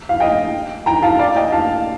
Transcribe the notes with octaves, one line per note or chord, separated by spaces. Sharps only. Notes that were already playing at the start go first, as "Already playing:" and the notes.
F5
D#5 G5
G5 A#5
F5 A5
D5 F5
D#5 G5
F5 A5